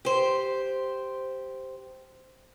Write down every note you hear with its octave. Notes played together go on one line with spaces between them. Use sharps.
G4 C5